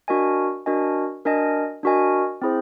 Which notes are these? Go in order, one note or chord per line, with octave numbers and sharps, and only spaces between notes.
D4 F#4 A#4 D#5 G#5
D4 F#4 A#4 D#5 G#5
D4 F#4 A#4 D#5 G#5
D4 F#4 A#4 D#5 G#5
C4 E4 G#4 C5